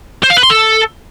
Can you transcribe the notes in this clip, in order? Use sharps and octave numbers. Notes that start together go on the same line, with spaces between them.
C5
F5
B4
C6
A4